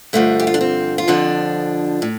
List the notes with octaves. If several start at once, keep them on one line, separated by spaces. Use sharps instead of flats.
G2 D3 F3 A3
G4
F4
D4
C4
F4
F2 D3 F3 D4
A2